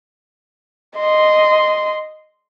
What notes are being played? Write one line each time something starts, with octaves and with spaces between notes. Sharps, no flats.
D#5 C6